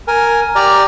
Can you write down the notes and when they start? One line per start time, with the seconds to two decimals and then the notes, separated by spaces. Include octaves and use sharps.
0.08 A#4 G#5
0.56 G4 D5 A#5 F6